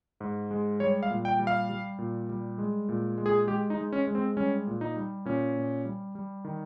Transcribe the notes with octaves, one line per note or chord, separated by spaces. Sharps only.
G#2
G#3
G3 C#5
F5
A#2
G5
G3
F5
G3
A#2
G3
G#3
A#2
G#3
G#4
G#3 G4
D#4
G#3
C#4
G#3
C4
G3 C#4
A#2
D#4
G3
A#2 C#4
A#2
G3
G3
D#3